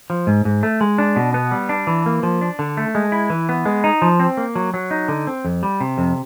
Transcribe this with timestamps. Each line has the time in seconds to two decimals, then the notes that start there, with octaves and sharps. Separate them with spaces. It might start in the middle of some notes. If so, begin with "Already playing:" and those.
0.10 F3
0.27 G#2
0.45 G#2
0.63 A3
0.81 G#3
0.98 D4
1.16 B2
1.34 B3
1.51 G3
1.69 D4
1.87 E3
2.06 A#3
2.23 F3
2.41 D4
2.59 D3
2.77 A3
2.95 G#3
3.12 E4
3.30 E3
3.49 B3
3.66 G#3
3.84 D#4
4.02 F3
4.20 C4
4.37 A#3
4.56 F#3
4.74 F#3
4.91 D#4
5.08 D3
5.27 C4
5.45 F2
5.63 G3
5.81 C3
5.98 F2